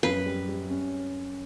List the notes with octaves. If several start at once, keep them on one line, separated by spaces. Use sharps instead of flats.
F#2 B4
G3
G3
C#4